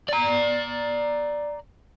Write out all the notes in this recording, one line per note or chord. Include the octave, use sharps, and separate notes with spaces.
D5 A#5